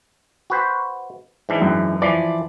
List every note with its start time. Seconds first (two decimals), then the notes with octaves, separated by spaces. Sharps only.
0.50 F#4 B4 C5
1.49 G#2 E3 D4
1.62 F#2
2.02 E3 F3 D5